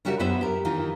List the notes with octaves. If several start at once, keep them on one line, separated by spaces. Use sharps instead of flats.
C#3 G3 F#4 G4 A#4 E5
F#2 B3 B4 C5 E5
G4 A#4
D#3 E3 D#4 F4